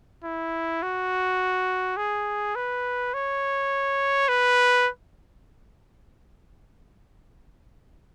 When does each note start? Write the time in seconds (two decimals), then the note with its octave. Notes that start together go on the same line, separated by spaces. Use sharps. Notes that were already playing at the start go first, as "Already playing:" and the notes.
0.24 E4
0.82 F#4
1.97 G#4
2.56 B4
3.14 C#5
4.29 B4